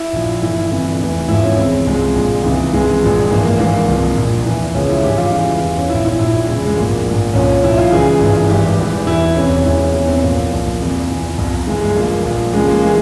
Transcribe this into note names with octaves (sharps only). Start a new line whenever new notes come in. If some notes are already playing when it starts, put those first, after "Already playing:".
Already playing: E4
A#1 A#2 F3
G1 G2 E3 E4
G1 F2 C3 E3
F1 E2 E3
G#1 G#2 F3 E4
C#4
C#2 C#3 E3 C4
C2 C3 F3 G#3
A#1 A#2 F3
C#2 C3 E3
C2 C3 E3 G#3
A#1 A#2 F3
G#1 G2 E3 A#3
A#3
G#1 G#2 E3 A#3
C2 C3 F3
A#1 A#2 F3
E2 E3
C#2 C#3 F3 C#4
E4
G#1 G2 E3 G4
F4
E1 E2 C#3 E3 F4
E2 E3
C#4
A#1 A#2 F3 E4
E4
A#1 A#2 F3 E4
E1 E2 C#3
G#3
A#1 G#2 F3 A#3
A#1 G#2 F3
C2 A#2 F3 C#4
C2 A#2 F3 E4
F4
C#2 C#3 E3 G#4
G#1 G2 E3
G#1 G2 E3 G4
E1 E2 E3
E1 E2 E3 E4
E1 E2 C3 C#4
E1 E2 E3
E1 E2 E3 C#4
C4
A#1 A#2 F3 A#3
C2 A#2 F3
E2 C3 F3
E2 E3
C2 C3 F3
G1 G2 E3 G#3
G#3
G1 G2 F3 A#3
A#1 A#2 F3
C#2 C#3 F3 G#3
A#3
E3 G#3